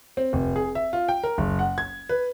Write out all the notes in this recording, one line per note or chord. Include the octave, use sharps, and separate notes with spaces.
C4
F1
G#4
E5
F4
G5
A#4
F#1
F#5
G#6
B4